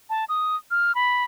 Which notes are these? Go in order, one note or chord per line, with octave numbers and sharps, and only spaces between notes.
A5
D#6
F6
B5